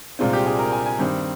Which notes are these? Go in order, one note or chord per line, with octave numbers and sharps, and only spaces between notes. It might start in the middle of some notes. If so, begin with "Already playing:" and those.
C2 A#2 G#3 C4 F4
G4
G#4
A#4
G#5
G#5
G2 D#3 G3 C4